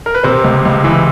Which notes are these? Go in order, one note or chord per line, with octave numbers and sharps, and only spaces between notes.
A#4
B4
C3 C5
C#2
C#2
E3